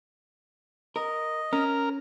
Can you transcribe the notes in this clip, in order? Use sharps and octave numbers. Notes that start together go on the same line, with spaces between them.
A#4 D#5
C#4 A#4